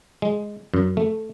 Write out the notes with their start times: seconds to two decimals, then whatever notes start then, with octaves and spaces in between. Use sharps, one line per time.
0.22 G#3
0.74 F#2
0.97 A3